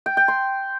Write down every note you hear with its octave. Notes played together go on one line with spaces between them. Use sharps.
G5
G5
C6